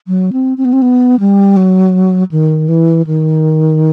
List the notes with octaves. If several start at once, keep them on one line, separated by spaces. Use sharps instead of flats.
F#3
C4
C4
B3
C4
B3
G3
F#3
D#3
E3
D#3